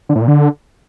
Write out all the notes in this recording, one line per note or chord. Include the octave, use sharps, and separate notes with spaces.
D3
A2
A#2
D3